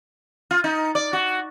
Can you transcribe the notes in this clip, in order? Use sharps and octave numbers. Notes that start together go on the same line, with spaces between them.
F4
D#4
D5
F#4